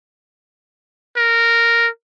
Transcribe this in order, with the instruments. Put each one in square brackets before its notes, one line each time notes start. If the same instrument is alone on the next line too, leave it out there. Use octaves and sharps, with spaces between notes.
[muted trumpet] A#4